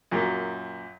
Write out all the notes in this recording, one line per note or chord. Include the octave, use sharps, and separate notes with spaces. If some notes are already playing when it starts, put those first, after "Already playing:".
F#2 A#2